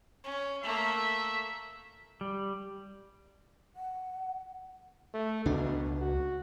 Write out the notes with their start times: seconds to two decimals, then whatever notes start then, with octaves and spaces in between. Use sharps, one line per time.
0.24 C#4
0.63 A3 A#3 E5
2.21 G3
3.76 F#5
5.14 A3
5.46 C#2 B2 D4
6.01 F#4